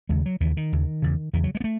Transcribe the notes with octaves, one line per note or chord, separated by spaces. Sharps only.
D#2 C#3 G#3
F#3
D#2 C#3 E3
D#3
D#2 C#3
E2 C#3
E2 C#3 E3
F#3
G#3
B3
A3